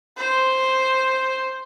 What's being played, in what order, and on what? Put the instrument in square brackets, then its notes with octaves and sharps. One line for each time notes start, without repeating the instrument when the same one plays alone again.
[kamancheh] C5